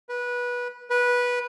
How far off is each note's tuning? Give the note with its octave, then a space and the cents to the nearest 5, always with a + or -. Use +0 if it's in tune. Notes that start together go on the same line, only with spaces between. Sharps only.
B4 -20
B4 -15